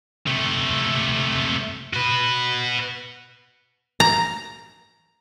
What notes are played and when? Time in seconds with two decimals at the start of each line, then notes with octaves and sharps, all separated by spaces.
0.26 C3 A3
1.93 F#4 B4
4.00 A#5